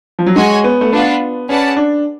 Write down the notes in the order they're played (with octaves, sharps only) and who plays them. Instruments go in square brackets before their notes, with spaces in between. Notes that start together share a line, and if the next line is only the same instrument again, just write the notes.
[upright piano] F3
F#3
[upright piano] G#3 [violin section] F#4 C#5 G#5
[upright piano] B3
A3
[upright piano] B3 [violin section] D4 F4 B4 F#5
[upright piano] C#4 [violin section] G#4 B4 D5 F#5 A5
[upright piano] D4